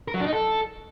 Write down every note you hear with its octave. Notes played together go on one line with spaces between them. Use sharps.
A#4
F#3
D4
D#4
A4